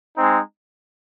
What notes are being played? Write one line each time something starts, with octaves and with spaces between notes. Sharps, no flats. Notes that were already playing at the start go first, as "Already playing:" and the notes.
G#3 C4 D#4